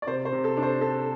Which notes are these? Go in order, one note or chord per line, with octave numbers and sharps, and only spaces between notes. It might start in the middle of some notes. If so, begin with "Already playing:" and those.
D5
C3 C5
C5
C3
A4
D4
C5
D4 A4